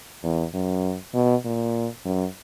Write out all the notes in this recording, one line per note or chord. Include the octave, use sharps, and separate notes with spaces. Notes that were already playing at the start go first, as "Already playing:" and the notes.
E2
F#2
B2
A#2
F#2